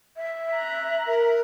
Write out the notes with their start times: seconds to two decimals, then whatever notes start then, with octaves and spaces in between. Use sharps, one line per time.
0.16 E5
0.54 A#5 F#6
1.07 A#4